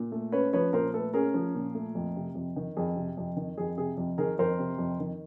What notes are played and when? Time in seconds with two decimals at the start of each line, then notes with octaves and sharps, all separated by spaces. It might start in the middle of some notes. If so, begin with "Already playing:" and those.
Already playing: A#2
0.12 A3
0.32 C#4 B4 C#5
0.53 F3 B4 C#5
0.73 A#2 A#4 C5
0.94 A3 A4 B4
1.14 C#4 G#4 A#4
1.34 F3
1.55 A#2
1.75 A3
1.95 F2
2.16 C3
2.35 F2
2.56 D#3
2.77 F2 G#4
2.96 C3
3.17 F2
3.37 D#3
3.58 F2 G#4
3.77 C3 G#4
3.97 F2
4.18 D#3 G#4 A#4
4.38 F2 A#4 C5
4.58 C3
4.79 F2
5.00 D#3